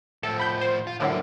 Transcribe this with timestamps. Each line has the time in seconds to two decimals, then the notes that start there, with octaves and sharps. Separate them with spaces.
0.23 A2 F3 A4
0.40 B5 G6
0.61 C5
0.87 F4
1.00 A2 D3 F#3 A#3 E4